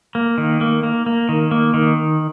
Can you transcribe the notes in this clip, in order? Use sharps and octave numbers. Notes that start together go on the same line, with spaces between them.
A#3
D#3
A#3
A#3
A#3
D#3
A#3
D#3